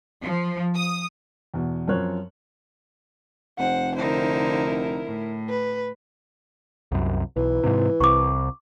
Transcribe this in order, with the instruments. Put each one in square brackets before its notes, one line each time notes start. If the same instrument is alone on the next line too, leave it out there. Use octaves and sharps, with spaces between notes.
[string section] F3
D#6
[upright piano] E2 B2
F#2 F3 C4 A#4 C#5 F#6
[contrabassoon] F1 [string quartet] C5 [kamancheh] F#5
[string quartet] D3 D#4 C5 [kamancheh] E4 A#4
[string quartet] A2
[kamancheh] B4
[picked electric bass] C2 F#2
[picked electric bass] B1 [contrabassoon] E3
[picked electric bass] G#2 C3
[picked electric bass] C2 [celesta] C#6 D6